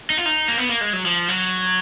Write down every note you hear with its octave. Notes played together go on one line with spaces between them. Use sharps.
D#4
F4
D#4
A#3
B3
A#3
G#3
F#3
F3
F#3